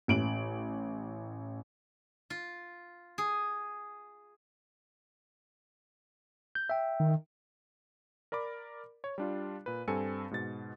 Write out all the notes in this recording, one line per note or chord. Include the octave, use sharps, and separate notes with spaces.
A1 D7 F#7
F4
G#4
G6
E5 G5
D#3
A#4 D5 B5 D6
C#5
G3 D4 F4
A#2 B4
G2 C4 A4 G#5 C#7
G#2 B2 A6